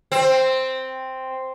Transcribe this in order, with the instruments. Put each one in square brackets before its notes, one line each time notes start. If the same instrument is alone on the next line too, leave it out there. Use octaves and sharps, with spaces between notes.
[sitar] C4